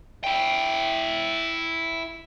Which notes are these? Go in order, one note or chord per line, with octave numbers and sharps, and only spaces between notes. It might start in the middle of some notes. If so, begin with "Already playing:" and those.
E4 G5